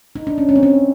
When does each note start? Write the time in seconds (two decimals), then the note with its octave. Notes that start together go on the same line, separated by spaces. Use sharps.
0.16 D#4
0.27 D4
0.38 C#4
0.49 C#4
0.56 C4
0.63 C#4